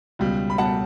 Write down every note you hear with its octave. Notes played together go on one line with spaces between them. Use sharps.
C#2 B2 G3
B5
B2 G3 F#5 A5